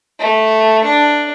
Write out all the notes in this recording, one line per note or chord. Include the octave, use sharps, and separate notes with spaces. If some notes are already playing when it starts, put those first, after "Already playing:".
A3
D4